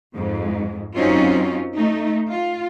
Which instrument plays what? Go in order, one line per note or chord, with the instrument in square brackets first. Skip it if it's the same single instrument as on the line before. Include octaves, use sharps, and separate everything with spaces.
[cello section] F2 G#2
F#2 F#3 C4 C#4 D#4 F4
A3 D#4
F4